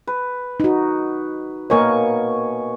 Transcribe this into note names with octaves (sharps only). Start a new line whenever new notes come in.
B4
D#4 F#4
B2 A#3 A#4 C#5 G#5 C#6